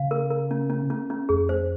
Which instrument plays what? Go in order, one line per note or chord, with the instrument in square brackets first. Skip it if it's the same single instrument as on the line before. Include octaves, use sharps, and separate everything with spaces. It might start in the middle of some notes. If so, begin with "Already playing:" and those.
Already playing: [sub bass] C#3 [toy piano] F5
[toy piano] A#4
A#4
C#4
C#4
C#4
C#4
[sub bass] F2 [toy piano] G#4
[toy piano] C5